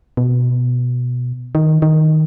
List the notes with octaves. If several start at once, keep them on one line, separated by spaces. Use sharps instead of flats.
B2
D#3
D#3